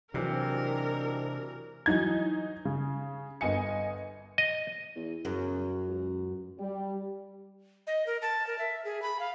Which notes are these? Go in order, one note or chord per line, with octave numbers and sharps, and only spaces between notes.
G#2 C3 E3 F#3 G#3 C4 D4 A#4
E3 F#3 D#4 G#6
C#3
G1 D#5 G#5 C#7
D#5
E2
F#2 C#3
C#2
G3
D#5
A#4
A5
A#4
E5
G#4
B5
F5